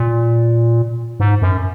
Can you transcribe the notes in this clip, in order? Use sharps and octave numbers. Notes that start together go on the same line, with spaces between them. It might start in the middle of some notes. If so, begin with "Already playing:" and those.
Already playing: A#2
G#2
F#2